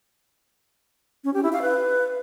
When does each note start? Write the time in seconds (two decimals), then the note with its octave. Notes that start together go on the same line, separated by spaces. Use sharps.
1.24 C#4
1.34 G4
1.43 E4
1.53 F5
1.62 B4